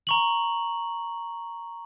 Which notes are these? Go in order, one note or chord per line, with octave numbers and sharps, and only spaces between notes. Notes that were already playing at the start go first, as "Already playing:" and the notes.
A#5 C#6 F#7